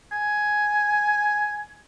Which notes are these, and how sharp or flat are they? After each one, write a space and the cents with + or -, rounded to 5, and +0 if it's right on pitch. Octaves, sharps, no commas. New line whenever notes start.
G#5 +10